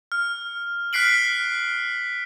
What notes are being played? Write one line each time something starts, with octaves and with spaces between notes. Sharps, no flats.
F6
F6 F#6 B6 C7 D7 F#7